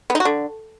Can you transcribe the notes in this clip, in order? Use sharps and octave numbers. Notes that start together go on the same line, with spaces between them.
B3
D#4
F#4
D3